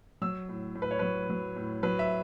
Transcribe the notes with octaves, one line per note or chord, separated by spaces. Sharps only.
F#3 E6
A2
A2
B4
C#5
F#3 B4
F#3
A2
F#3 B4
E5